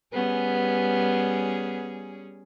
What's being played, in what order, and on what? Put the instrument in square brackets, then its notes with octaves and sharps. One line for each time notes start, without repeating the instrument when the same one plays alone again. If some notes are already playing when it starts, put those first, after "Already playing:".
[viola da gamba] G3 C#4 G#4 [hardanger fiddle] B3